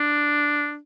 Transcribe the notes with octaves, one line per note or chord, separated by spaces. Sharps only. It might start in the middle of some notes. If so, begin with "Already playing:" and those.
Already playing: D4